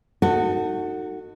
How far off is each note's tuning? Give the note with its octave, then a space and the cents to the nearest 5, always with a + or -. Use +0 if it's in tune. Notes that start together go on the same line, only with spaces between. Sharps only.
D#4 +0 F#4 +0 A4 +35